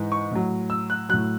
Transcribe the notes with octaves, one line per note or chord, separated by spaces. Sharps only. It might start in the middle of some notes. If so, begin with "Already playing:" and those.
Already playing: G#2 E3
C#6
A2 F#3
E6
F#6
A2 F#3 F#6